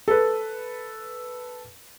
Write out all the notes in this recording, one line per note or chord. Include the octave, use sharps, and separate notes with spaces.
A4 B4